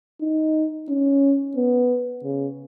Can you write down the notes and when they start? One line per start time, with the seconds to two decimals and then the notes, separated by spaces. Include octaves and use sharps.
0.21 D#4
0.89 C#4
1.57 B3
2.24 C#3